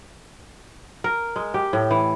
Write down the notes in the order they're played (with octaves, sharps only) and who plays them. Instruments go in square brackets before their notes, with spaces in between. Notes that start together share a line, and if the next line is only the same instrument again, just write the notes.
[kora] A#4
G#3
G4
A2
E3